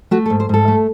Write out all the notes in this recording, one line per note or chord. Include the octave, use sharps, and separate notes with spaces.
A3 F#4
A4
G#2
C5
G#2 A4
A3